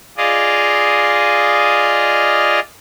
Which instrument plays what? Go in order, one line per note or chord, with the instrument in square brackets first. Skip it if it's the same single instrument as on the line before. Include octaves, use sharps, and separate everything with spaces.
[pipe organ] F4 G#4 D5 D#5 F5